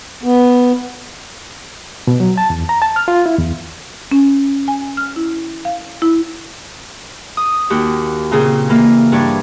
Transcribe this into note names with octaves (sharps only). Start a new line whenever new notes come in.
B3
B2
F#3
A5
E2
A#5
A5
F6
F4
E4
E2
C#4
G#5
F6
E4
F5
E4
D#6
D#2 F#4 G4
A#2 C#3 C4 G#4
E3 A#3
G2 C#5 D5